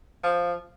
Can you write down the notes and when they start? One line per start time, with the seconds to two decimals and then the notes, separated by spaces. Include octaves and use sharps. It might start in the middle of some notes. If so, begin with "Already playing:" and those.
0.23 F3